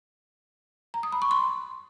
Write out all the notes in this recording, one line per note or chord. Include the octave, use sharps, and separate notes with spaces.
A#5
D#6
B5
C#6
C6